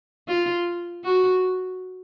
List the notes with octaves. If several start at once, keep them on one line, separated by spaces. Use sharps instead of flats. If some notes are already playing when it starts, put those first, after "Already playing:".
F4
F#4